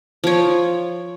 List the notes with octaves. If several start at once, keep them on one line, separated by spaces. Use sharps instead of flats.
F3 C#5